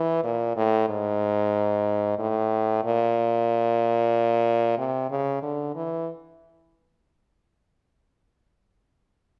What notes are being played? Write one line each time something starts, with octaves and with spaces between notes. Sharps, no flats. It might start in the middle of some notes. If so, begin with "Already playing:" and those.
Already playing: E3
A#2
A2
G#2
A2
A#2
C3
C#3
D3
E3